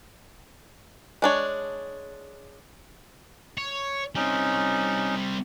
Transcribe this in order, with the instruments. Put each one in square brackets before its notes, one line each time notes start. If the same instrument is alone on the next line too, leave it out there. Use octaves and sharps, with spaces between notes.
[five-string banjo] G#3 D4 C#5
[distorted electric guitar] C#5
[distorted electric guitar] G3 C4 [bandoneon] C#4 D#4